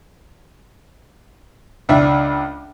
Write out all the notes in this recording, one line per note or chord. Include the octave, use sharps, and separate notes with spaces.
C#2 D4 E5